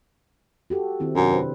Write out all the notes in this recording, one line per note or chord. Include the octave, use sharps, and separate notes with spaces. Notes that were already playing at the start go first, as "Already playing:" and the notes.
F#4 G4 A4
D#3 C4 E4
F#2 C3 D4
B4 C5